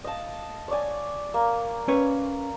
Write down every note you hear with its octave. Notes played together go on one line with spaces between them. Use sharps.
D#5 F5 A5
C#5 D5 G#5
A#3
C#4 B4 C#5